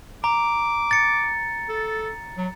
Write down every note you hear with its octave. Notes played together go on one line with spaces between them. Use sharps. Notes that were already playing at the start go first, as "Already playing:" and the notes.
A#5 D6
A6 C#7
A4
F#3